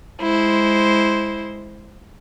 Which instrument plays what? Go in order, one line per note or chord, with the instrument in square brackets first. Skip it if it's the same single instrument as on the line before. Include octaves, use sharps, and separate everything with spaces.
[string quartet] G#3 E4 C5